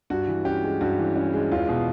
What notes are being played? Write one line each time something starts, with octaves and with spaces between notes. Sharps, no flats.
G2 F#4
E3
C#4 G4
G#3
G2 F#4
E3
C#4
G#3
E2 F4
B2